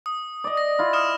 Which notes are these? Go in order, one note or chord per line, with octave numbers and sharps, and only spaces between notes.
D#6
D5 D#5
A#6
E4 F4
D#6 F6 E7